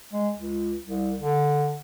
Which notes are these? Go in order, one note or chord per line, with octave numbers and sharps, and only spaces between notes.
G#3
C#2
C2
D3